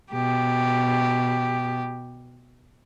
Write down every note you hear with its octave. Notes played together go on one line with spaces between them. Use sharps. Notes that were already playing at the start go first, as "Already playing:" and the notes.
B2 G4